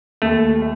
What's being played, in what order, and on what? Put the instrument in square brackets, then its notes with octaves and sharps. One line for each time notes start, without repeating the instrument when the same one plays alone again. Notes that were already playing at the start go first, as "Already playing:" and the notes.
[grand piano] D#2 [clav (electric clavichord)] A3